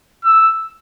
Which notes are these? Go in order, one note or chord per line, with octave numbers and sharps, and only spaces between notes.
E6